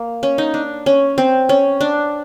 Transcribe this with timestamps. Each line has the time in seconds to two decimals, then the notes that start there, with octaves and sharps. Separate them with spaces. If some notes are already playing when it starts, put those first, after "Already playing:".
Already playing: A#3
0.23 C#4
0.38 D#4
0.54 D4
0.86 C#4
1.18 C4
1.49 C#4
1.81 D4